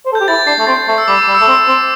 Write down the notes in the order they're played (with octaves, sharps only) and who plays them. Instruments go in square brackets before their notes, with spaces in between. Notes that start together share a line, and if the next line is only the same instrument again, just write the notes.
[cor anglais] C5
A4
[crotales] G6
[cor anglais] G4
[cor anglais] E4 [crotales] A6
[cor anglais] D4 [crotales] C7
[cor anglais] A3
[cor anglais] C4 [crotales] A6
[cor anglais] A3
[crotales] E6
[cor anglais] G3 [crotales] D6
[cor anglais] G3
[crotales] E6
[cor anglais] A3
C4
C4